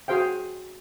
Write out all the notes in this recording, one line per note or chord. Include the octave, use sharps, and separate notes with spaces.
F#4 G#4 C5 F5 G5